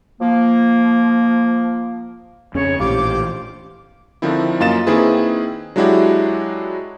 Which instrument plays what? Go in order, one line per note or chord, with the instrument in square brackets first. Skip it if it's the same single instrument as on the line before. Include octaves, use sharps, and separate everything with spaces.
[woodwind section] F3 A#3
[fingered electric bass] F2 C#4 D4 [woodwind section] C#3 C#5
[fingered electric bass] A#1 A2 E3 [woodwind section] F4 C5 D6 [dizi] G4
[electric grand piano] D3 D#3 F3 C4 E4
F#2 A#3 F4 D#5 A6 E7
D#3 A#3 C4 E4 G#4 B4
F#3 G#3 D4 E4 F#4 G4